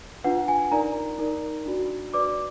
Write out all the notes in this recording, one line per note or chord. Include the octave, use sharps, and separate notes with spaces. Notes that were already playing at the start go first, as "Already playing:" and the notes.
D4 F4 B4 F#5
G#5
D#4 A#4 D5 A#5
D#4 A#4 D5
D4 F#4 D5
F#4 B4 D5 D6